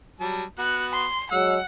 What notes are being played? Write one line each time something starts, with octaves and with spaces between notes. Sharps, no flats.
F#3 G3 A5
B3 F#4 F#6
C6
F#3 G#3 F#5 E6